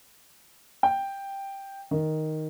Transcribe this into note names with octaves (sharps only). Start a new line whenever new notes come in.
G5
D#3